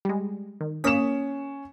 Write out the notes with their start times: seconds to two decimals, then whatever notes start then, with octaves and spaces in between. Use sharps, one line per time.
0.05 G3 G#3
0.61 D#3
0.84 A#3 C#4 D#6 B6 E7